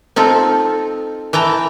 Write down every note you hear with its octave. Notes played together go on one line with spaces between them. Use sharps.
C4 D#4 F4 A4
E3 G5 A5 A#5